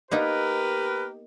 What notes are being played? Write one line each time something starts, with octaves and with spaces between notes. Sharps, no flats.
A#3 B3 D#4 G4 A#4 B4